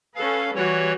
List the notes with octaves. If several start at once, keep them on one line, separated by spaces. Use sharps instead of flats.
C#4 A4 B4 F5
E3 G3 F#4 C#5